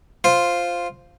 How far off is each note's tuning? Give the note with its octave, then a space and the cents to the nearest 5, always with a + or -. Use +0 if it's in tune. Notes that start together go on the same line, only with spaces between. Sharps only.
F4 +0 C5 +0